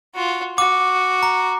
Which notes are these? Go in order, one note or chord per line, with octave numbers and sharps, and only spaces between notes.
F4 F#4
F#4 D6
A#5